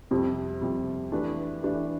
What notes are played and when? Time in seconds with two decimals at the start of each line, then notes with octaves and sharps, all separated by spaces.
0.11 F2 C3 G3
0.61 F2 C3 G3
1.11 E3 A3 D4 G4 B4
1.63 E3 A3 D4 G4 B4